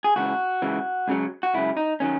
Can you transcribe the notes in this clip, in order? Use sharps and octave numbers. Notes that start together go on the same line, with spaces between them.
G#4
C#2 C#3 E3 F#4
C#2 C#3 E3
C#2 C#3 F#3
F#4
C#2 C#3 F#3 E4
D#4
D#3 F#3 C#4